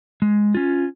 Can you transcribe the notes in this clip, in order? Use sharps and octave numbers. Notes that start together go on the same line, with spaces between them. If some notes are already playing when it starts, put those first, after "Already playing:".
G#3
C#4 F4